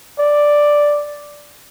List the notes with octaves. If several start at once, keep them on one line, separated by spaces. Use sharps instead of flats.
D5